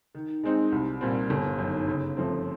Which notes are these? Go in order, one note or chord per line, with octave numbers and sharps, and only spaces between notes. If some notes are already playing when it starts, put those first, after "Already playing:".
D#3
G#3 C4 D#4
C2
A#2 G3 C4
G1
F#2 D#3
C#3
F3 A3 C4